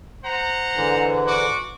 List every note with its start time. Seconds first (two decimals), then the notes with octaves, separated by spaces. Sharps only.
0.24 C5 F#5 A#5
0.75 G#2 D3 E3
1.26 F#4 F#5 D6